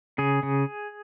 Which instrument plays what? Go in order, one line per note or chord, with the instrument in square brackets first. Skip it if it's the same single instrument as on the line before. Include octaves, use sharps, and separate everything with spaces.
[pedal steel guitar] C#3 G#4
C#3